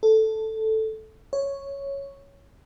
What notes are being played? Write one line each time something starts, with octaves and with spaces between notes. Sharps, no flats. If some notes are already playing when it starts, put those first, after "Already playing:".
A4
C#5